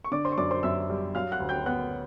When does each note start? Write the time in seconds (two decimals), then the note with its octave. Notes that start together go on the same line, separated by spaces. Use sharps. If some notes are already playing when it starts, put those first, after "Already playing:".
0.04 C#6
0.12 D3 D5 D6
0.25 C5 C6
0.32 C#6
0.38 F#2 D5 D6
0.51 C5 C6
0.63 F#2 E5 E6
0.90 G3
1.15 F#3 F5 F6
1.32 F#5 F#6
1.40 D2
1.49 G5 G6
1.66 B3 F#5 F#6